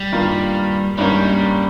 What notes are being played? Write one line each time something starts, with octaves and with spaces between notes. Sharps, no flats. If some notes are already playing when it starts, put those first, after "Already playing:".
Already playing: G3
G2 D#3 A#3 F4
G#1 G2 D#3 G3 A#3 C#4